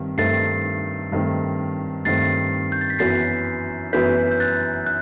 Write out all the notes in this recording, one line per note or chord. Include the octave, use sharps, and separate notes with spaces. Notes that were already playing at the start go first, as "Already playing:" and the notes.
Already playing: G2 D#3 C4
G2 D#3 A3 C4 A6 C7
G2 D#3 A3 C4
G2 D#3 A3 C4 A6 C7
G6
A6
B6
F#2 E3 B3 F#4 B4 A6 C7
F#2 E3 B3 F#4 B4 G6 B6
G6
F#6 A6
F#6